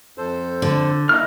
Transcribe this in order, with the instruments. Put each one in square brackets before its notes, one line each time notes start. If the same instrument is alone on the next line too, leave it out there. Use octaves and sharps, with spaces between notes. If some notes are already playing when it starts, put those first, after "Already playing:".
[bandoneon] F2 A4 C5
[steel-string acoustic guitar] D3
[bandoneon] A#3 D#4 E4 [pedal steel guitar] D#5 F6